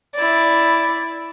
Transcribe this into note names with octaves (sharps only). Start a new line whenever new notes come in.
E4 D5